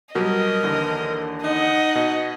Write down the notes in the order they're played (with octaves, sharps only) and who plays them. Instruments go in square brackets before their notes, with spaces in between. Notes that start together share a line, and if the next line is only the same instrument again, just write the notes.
[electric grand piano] B2 F#3 G3 [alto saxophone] A#4 [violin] D#5
[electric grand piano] D#2 D3 E3
[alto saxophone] D#4 [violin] D#5 F#5
[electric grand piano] B2